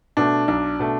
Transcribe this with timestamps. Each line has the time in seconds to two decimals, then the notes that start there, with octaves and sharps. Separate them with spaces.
0.17 B2 A3 D4
0.48 B1 D4
0.79 B2 A3